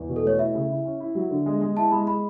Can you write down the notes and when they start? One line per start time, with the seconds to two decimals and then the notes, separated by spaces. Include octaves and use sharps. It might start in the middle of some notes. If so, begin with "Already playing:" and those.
Already playing: E2
0.09 B2
0.16 A4
0.24 A3 C#5
0.39 E4 E5
0.55 C#3
0.70 E4
0.85 C#4
1.00 E4
1.15 F#3
1.31 D3
1.46 G#3
1.62 G#3
1.77 E4 A5
1.92 G#3 B5
2.07 G#3 B5